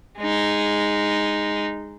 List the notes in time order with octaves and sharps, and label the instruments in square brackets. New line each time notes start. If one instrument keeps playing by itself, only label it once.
[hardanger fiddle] G#3 D#4